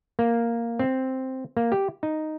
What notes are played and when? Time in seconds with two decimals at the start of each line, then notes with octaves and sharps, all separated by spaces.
0.19 A#3
0.79 C4
1.57 A#3
1.72 G4
2.03 D#4